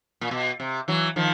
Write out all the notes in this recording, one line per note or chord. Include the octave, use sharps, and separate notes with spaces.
A#2
B2
C3
E3 F#3
D#3 F3